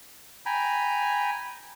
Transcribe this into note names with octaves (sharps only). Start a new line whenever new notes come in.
G5 G#5 A#5 B5